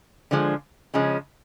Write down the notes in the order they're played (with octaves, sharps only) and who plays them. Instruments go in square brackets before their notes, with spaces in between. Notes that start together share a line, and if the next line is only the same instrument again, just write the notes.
[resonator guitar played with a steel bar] D3 F3 G#3
C#3 F3 G#3 C#4